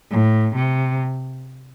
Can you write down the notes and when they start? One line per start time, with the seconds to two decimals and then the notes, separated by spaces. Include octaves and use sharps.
0.11 A2
0.56 C3